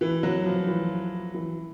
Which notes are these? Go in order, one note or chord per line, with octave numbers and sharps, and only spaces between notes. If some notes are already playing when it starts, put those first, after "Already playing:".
E3
F#3
F3
E3
E3